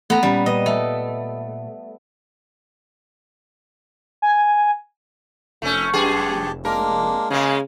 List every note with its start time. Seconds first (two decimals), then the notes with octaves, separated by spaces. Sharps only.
0.10 A3 B3 A4 A#5
0.23 A#2 G3 C#4
0.46 A#2 B4 D#5
0.66 A3
4.22 G#5
5.62 F1 A3 C#4
5.94 F#2 G4 G#4 A5
6.65 G#3 A#3 D4 A#4
7.30 C#3 G#3 A#3 G#5